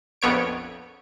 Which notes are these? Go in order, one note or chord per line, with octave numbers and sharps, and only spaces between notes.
A#1 F2 B3 C#5 D7